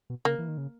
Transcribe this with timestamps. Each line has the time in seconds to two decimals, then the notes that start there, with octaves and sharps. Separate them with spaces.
0.10 B2
0.25 C#3 A#3
0.39 E3
0.48 D#3
0.57 C#3